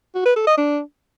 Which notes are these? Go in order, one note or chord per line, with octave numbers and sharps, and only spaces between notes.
F#4
B4
A4
D#5
D4